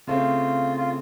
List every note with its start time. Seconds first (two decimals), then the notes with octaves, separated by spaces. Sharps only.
0.07 C#3 A3 C4 F4
0.78 F4